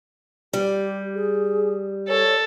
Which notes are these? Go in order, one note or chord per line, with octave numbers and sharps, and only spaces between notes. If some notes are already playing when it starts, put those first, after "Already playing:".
G3 G4
G#4
A4 C#5